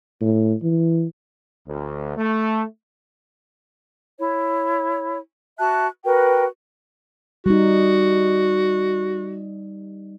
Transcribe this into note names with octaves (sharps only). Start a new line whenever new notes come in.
A2
E3
D2
A3
E4 C#5
F#4 E5 A5 F#6
F#4 A#4 B4 G5
G3 D#4 F#4